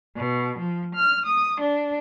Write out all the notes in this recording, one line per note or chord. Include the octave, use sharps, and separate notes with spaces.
B2
F3
F6
D#6
D4